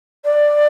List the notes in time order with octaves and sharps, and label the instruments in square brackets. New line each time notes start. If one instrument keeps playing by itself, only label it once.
[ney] D5